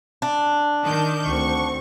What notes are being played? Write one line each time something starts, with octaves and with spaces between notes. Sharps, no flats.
D4
D#3 A5 G6
D2 C4 C#6